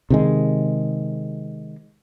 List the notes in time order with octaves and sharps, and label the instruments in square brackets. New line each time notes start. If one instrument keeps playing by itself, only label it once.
[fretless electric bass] C3 D#3 G#3